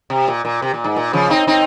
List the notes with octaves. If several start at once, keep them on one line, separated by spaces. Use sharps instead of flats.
C3
A#2
A#2
C3
A#2
G#2
A#2
C#3 F3
C4 D#4
C4 D#4